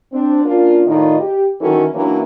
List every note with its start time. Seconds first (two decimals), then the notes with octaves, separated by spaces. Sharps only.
0.13 C4 D4
0.45 A#3 C#4 D4 F4
0.87 A2 D#3 D#4 F4 D5 D#5
1.20 G4
1.61 D#3 E3 F#3 C#4 A4
1.95 E3 F#3 A#3 C#4 D4